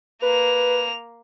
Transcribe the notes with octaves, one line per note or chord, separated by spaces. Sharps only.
A#3 B4 F7